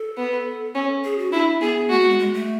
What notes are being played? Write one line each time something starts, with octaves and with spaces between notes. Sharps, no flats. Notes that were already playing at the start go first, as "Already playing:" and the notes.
Already playing: A4
B3
C#4
G#4
F#4
D4 E4
B3 G#4
A3 F#4
B3
G#3
G#3
A3